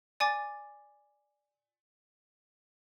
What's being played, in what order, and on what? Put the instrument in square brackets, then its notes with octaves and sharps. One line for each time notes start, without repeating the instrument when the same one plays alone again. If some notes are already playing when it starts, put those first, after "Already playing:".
[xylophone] D5 G#5 D6 A6